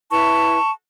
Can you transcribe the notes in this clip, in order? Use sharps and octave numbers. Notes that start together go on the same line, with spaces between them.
E4 B4 A5 C#6